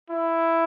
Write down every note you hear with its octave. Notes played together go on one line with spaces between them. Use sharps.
E4